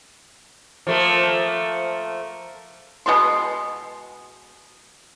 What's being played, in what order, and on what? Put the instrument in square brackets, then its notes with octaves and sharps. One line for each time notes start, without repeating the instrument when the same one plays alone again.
[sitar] F3 A3 A#3
[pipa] B2 G#3 B3 C6